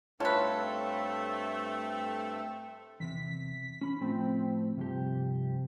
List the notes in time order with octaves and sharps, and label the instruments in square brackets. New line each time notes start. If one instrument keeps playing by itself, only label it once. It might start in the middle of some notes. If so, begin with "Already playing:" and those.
[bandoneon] G2 C4 A4 [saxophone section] A3 [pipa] F4 B4 [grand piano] C#5 A5
[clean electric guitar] E2 C3 [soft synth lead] B6
[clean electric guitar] C#4 B5
[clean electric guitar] A2 F3 A3 [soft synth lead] C4
[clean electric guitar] G2 F3 G4 [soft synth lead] C3